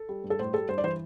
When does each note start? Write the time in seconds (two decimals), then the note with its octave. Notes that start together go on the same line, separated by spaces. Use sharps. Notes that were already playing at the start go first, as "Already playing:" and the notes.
Already playing: A4
0.09 G3
0.24 G2
0.30 A4
0.39 A2 C5
0.54 G3 A4
0.69 G2 C5
0.78 D5
0.84 E3 C5